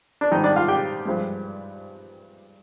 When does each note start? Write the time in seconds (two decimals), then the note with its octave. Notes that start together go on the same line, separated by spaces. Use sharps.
0.21 D4
0.31 G#2 D#3 G3 D#4
0.44 D4 D5
0.56 F4 F5
0.68 G4 G5
1.05 G2 F3 G#3